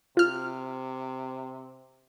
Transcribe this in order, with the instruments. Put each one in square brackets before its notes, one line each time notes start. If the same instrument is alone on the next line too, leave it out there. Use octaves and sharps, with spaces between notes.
[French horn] C3 [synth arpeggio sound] F4 F6